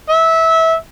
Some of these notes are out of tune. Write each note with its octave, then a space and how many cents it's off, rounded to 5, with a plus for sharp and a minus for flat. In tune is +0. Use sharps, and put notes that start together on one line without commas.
E5 -20